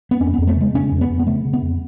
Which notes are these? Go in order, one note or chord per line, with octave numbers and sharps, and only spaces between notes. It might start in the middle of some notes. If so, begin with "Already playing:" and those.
B3
F2 C#4
B3
F2
A3
C#3 G#3
C#3 C#4
F2
B3
F2
B3
C#3 A3
C#3
B3
F2